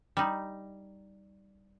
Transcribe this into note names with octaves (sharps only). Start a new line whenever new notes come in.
G3 D#4